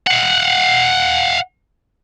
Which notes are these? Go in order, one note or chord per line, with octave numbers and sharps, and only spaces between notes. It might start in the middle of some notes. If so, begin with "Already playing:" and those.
F5 F#5